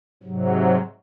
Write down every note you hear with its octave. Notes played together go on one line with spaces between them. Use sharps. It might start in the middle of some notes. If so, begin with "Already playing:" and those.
G#2 C3 F#3